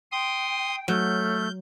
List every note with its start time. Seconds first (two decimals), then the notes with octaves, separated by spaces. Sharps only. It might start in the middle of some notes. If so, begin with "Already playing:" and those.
0.11 G5 C6 D#6
0.88 F#3 A3 F6 G6